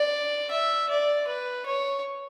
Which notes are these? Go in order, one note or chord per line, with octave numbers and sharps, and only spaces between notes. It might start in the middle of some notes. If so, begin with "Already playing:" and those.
Already playing: D5
E5
D5
B4
C#5